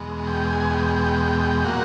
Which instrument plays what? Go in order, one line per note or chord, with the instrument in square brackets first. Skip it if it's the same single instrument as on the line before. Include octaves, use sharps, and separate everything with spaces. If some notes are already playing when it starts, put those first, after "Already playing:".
Already playing: [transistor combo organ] E2 B2 G#3
G5
G#5
G5
G5
A#2 F#3 A#3 F#5